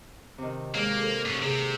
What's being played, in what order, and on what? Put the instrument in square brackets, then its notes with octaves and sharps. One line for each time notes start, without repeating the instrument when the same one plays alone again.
[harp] C3 D#3
[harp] D#2 G#3 [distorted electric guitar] A#3
[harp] A4 C5
[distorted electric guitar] G#2 C#4
[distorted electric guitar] C3 [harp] G#4